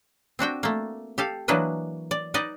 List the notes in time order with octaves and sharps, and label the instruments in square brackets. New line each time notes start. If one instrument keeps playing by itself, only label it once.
[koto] C4 D4 F#4 G5
A3 A#3
G4 A4 F5
E3 F#3 A#3 D4 B4 D#5
D5
D#4 B4 D5 D#5